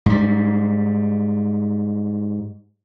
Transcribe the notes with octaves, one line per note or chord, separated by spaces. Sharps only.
G#2 G3